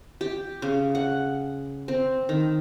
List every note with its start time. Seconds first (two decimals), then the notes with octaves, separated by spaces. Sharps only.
0.21 G4
0.62 C#3
0.95 F#5
1.88 C4
2.29 D#3